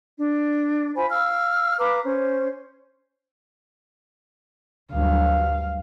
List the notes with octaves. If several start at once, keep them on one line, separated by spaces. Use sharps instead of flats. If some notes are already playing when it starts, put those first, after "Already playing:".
D4
F4 C5 G#5 B5
F5 E6 F6
B4 F5 A#5 D6
C#4 C5
D2 G2 F#3 F5